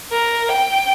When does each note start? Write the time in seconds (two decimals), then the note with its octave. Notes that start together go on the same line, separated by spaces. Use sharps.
0.12 A#4
0.50 G5